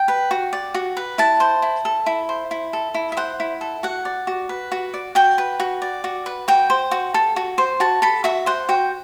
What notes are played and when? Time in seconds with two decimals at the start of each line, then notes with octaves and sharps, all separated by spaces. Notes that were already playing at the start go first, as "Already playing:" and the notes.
Already playing: G5
0.08 B4
0.31 F#4
0.53 D5
0.74 F#4
0.97 B4
1.18 E4 A5
1.40 C5
1.62 E4
1.85 A4
2.06 E4
2.29 C5
2.51 E4
2.73 A4
2.94 E4
3.12 E5
3.17 C5 F#5
3.40 E4
3.61 A4
3.83 F#4 F#5
4.05 D5
4.27 F#4
4.49 B4
4.72 F#4
4.94 D5
5.15 F#4 G5
5.38 B4
5.60 F#4
5.82 D5
6.04 F#4
6.26 B4
6.48 F#4 G5
6.70 C5
6.91 F#4
7.14 A4
7.36 F#4
7.58 C5
7.80 F#4 A5
8.02 A4 B5
8.24 F#4 E5
8.46 C5 F#5
8.69 F#4 G5